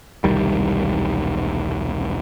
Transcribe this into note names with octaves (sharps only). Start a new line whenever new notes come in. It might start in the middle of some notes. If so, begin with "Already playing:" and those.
E1 C2 D#3 G3